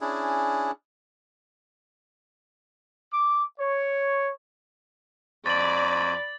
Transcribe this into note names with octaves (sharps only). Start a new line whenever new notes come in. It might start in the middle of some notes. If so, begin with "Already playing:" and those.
C#4 D4 E4 G#4
D6
C#5
F2 D5 B5 A6 F#7